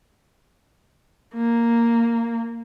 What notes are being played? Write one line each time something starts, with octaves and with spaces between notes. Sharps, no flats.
A#3